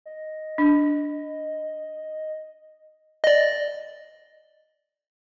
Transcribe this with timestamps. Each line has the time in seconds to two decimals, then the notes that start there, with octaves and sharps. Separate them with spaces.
0.06 D#5
0.58 D4
3.24 D5 D#5